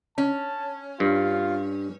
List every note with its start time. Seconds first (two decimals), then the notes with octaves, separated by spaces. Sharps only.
0.18 C#4 A5
1.00 G2 F4